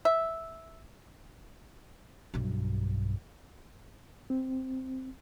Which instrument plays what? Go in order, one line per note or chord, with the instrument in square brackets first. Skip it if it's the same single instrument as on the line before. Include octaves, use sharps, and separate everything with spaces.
[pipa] E5
[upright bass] B1 G2
[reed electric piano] C4